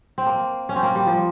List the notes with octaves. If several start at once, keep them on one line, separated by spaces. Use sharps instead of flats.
C4
A#3
C#4
C4
A#3
G3
F3